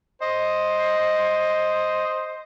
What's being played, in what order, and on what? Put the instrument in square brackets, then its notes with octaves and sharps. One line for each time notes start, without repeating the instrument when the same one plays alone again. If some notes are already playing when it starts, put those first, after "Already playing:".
[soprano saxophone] C5 [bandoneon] D#5